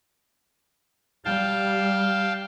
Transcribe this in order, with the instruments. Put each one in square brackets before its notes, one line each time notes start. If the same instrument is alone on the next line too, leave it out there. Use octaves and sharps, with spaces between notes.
[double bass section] G3 [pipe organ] F5 G5 A5